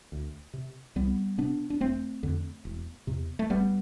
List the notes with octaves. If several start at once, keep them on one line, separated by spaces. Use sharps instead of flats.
D2
C3
C2 G3 B3
C3 B3 D4
D4
F1 A3 C4
F2 D3
E1
E2 C3
A3
G1 G3 B3